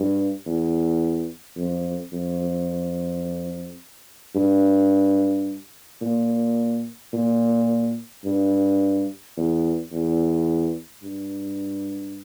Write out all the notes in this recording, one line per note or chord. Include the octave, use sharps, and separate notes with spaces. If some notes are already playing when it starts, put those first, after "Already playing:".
Already playing: G2
E2
F2
F2
G2
A#2
A#2
G2
E2
E2
G2